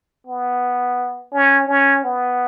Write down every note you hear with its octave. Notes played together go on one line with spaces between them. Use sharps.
B3
C#4
C#4
B3